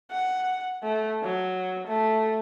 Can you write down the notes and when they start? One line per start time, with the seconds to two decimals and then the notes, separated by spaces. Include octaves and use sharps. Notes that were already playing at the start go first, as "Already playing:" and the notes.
0.11 F#5
0.83 A3
1.23 F#3
1.87 A3